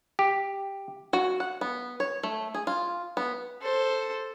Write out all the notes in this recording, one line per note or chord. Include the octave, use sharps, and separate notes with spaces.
G4
F#4
F#5
B3
C#5
A3
G#4
F4
B3
A4 C5